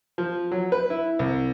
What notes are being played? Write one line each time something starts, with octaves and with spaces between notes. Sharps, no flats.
F3
F#3
B4
E4
C2